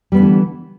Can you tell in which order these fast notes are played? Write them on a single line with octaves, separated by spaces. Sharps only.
G3 B3 G#3 D3 E3